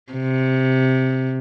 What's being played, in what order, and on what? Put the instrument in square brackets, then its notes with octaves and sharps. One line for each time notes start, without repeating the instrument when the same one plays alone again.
[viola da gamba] C3